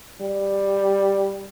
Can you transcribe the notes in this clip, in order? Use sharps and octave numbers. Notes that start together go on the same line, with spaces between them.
G3